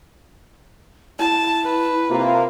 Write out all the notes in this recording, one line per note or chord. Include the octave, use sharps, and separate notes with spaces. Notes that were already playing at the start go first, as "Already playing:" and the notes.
E4 A5
B4
C3 A#3 F4